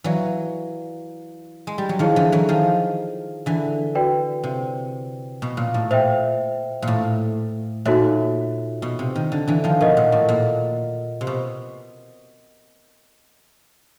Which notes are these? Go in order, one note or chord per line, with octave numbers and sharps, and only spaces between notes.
E3 F#3 B4 D5 F5
G#3
G3
F#3
D#3 F3 E4 G#4 C#5
D3 E3
E3 F#3
D#3 F3
D3 E3
F#4 B4 D5 G5
C3
B2
A#2
A2
A#2 C5 E5 G5
A#2
A2
A#2 D#4 F#4 A4 C#5 E5
B2
C3
D#3
D3
D3 E3
D#3 F3
B2 A#4 D#5 F#5
A#2
A2
A#2
C3
B2